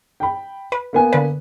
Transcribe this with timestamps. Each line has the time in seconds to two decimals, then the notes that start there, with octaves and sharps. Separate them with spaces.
0.20 G5 B5
0.72 B4
0.93 A#3 B3 G#5
1.13 D3 B4